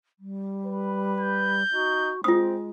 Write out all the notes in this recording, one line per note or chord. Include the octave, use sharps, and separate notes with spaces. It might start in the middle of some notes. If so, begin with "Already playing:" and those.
G3
B4
G6
D#4 F#4
G#3 C4 F4 D#6